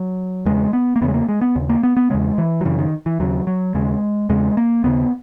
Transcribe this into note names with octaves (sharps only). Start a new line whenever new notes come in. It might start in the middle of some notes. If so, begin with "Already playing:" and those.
Already playing: F#3
E2 C#3 G#3
B3
A#3
E2 C#3 B3
G#3
A#3
G#3
B3
D#2 C#3
A#3
B3
B3
E2 C#3 G#3
E3
F#3
F#2 C#3 E3
D#3
E3
D#2 C#3 F#3
F#3
D#2 C#3 G#3
E2 C#3 G#3
A#3
D#2 C#3 B3